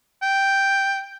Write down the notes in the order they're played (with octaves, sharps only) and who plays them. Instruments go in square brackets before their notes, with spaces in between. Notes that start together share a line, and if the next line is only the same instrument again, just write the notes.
[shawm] G5